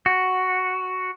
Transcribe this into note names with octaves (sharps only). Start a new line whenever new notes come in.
F#4